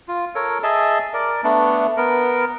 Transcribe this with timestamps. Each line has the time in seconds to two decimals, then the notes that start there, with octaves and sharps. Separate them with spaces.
0.08 F4
0.35 A4 A#4 C#5
0.63 G#4 D#5 E5 A5
1.14 A#4 D5
1.44 A3 B3 D4
1.97 B3 A#4